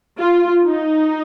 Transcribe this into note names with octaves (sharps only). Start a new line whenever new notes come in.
F4
D#4